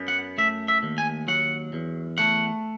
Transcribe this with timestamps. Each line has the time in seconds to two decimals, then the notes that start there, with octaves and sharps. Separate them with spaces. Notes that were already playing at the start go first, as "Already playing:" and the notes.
Already playing: F#2 B3
0.08 F#5
0.38 A3 E5
0.68 E5
0.83 D#2
0.98 G#5
1.28 F#3 F#5
1.73 E2
2.18 A3 F#5